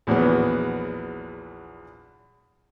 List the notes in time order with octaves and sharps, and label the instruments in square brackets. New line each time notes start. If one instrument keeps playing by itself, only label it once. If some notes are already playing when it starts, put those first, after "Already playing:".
[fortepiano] A#1 E2 F#3 B3